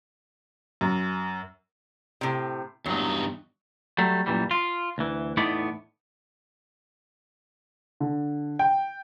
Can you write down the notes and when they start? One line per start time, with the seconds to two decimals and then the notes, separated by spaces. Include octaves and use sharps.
0.81 F#2
2.21 A2 C3
2.86 E2 G2 F#3 D#4
3.98 F#3 G3 A3
4.26 F#2 A#2 E3 G3
4.51 F4
4.98 D2 E3
5.37 E2 A2 B3 D#4 E4 D5
8.00 D3
8.59 G5